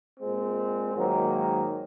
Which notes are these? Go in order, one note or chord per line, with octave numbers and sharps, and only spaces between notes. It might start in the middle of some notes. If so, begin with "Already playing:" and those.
A#2 G#3 C4
G#2 D#3 F#3 A#3